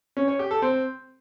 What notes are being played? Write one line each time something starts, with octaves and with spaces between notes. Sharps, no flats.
C#4
C#5
G4
A4
C4